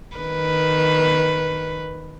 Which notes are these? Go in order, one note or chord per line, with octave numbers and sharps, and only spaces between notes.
D#3 B4